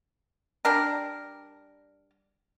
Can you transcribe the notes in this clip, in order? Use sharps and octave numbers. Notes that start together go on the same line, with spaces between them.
G3 D4 A#4